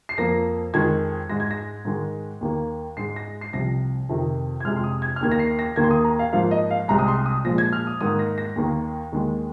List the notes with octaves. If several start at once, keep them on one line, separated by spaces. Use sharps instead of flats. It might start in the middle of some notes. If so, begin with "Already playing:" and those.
C7
F2 F3 A#3 A#6
F2 D#3 G#3 G#6
G#2 G#3 A#6
G#6
A#6
G#2 D#3 G#3
D#2 D#3 A#3
G#2 G#3 C7
A#6
C7
C2 C3 F3 A#6
F2 C3 D#3
G#6
F2 C3 G#3 F6
C6
D#6
G#6
F6
D#2 D#3 A#3 G#6
A#6
C7
A#6
D#2 D#3 A#3 G#6
C6
D#6
A#5
F5
G#2 F3 A#3 F5
D#5
F5
C2 C3 G#3 A#5
D#6
C6
D#6
A#2 F3 G#3 A#6
G#6
F6
D#6
G#2 D#3 A#3 D#6
A#6
A#6
D#2 D#3 A#3
D#2 D#3 G#3